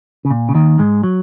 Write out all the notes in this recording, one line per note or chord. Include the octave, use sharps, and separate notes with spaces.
C#3
A#2
C#3
D#2 D#3
G#2 G#3
F#3